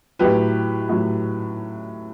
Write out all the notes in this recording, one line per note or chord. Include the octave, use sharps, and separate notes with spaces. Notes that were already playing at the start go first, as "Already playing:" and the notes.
A2 F#3 G4 B4
A2 F#3